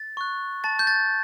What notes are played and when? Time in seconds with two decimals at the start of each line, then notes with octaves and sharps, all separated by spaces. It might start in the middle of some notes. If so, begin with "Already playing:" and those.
Already playing: A6
0.17 C#6 F#6
0.64 A5 A6
0.79 G6
0.87 A6